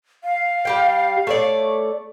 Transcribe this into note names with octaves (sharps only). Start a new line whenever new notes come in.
F5
G3 G4 G5
A3 C#5 D5